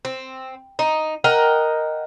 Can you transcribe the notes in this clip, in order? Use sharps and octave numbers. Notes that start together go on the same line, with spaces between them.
C4
D#4
A#4 D#5 F#5 G5